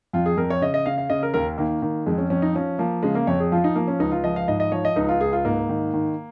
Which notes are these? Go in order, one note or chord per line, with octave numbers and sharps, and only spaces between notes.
F2 F4
G#4
F2 A#4
C#5
C#3 D#5
D#5
C#3 F5
F5
C#3 D#5
A#4
D#2 A#4
D#3 A#3
D#3
F2 G#3
C#4
F2 C#4
D#4
F3 C#4
F3 A#3
C#3 G#3
A#3
F2 C#5
G#4
F3 F4
D#4
F3 A#3
C#4
C#2 D#4
F4
F3 D#5
F5
G#2 D#5
D#5
F3 C#5
D#5
C#2 D#4
F4
C#2 G#4
F4
G#2 A#3
D#3
D#3